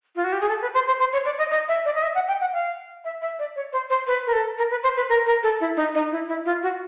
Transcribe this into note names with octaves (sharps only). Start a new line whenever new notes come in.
F4
F#4
G4
G#4
A4
B4
C5
C5
C5
C#5
D5
D#5
D#5
E5
D5
D#5
E5
F#5
G5
F#5
F5
E5
E5
D5
C#5
C5
C5
B4
A#4
A4
A#4
B4
C5
B4
A#4
A#4
A4
E4
D#4
D#4
E4
E4
F4
F#4